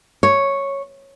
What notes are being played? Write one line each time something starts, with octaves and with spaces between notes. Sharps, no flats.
C#5